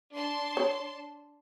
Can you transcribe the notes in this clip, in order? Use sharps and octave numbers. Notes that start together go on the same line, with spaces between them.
D4 A5 C6
C#5